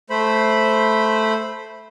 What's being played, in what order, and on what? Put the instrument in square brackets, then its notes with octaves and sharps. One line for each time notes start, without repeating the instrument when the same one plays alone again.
[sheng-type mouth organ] A3 C5 B5